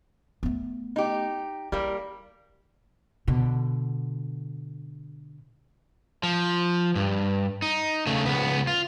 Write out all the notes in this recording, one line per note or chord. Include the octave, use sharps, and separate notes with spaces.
A3 B3
D#4 G4
G3 A#3 E4
B2 D3
F3
G2
D#4
C#3 A3
C#2 B3
F4